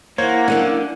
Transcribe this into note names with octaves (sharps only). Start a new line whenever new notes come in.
A#3 E4 C5 C#5 F#5 G#6
D3 F#3 A#3 C#4